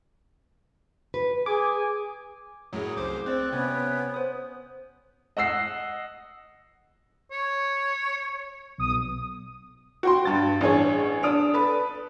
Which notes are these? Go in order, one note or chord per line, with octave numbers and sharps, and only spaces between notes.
B4
G#4 G#5 D6
F#2 A2 F#3 A3 G#4
C2 C5 D6
C4 C5 D5 F#6
C3 B3 C#4 C#5 G5
C5 D#6
D#5 F#5 E6 C7
C#5
B1 D#6
F#4 G5 C6
G2 A6
A1 D4 G#4 C#5
D4 D#6 D7 F7
A4 B4